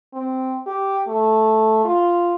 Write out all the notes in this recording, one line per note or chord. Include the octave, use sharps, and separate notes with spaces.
C4
G4
A3
F4